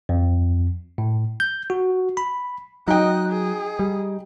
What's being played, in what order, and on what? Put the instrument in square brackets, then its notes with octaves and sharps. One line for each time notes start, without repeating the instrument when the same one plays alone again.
[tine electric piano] F2
A2
G6
F#4
B5
[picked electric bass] F#3 [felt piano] D#4 G5 [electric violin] D#5 F#6
[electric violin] G#4
[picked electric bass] G3